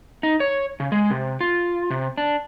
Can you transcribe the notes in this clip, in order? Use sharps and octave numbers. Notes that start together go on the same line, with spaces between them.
D#4
C#5
C#3
G#3
C3
F4
C3
D4